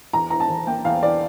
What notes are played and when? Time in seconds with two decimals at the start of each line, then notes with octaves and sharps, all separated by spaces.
0.13 E2 A#5
0.30 E3 A#5
0.40 A5
0.49 E2
0.67 A#3 G5
0.85 E2 F5
1.03 E3 D5